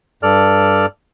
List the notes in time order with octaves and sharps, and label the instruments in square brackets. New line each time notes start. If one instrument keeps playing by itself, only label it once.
[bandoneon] G2 A4 D5 F6